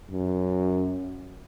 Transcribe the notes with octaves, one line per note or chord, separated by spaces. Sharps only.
F#2